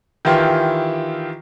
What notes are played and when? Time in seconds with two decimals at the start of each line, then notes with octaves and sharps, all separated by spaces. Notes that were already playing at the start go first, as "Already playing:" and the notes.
0.25 D#3 E3 E4 F4 G4